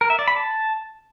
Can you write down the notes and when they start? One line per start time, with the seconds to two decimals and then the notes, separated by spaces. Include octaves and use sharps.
0.01 A#4
0.10 E5
0.19 D5
0.28 B5
0.36 A5